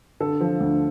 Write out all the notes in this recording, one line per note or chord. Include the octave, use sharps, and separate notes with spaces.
D3 A4
F3
D2